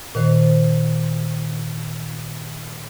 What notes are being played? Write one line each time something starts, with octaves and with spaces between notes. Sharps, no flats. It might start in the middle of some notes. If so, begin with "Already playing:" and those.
A#2 D#3 C5